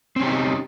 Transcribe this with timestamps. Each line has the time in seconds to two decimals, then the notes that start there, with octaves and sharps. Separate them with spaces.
0.16 C4
0.20 C#4
0.23 G4
0.26 D#4